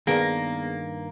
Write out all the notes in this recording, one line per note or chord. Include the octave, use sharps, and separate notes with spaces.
G2 D#3 A#3 B3 G#4 A#6